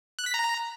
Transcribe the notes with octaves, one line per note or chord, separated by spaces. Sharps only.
F#6
B6
A#5